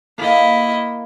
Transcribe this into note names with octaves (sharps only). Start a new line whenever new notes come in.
A#3 E4 D#5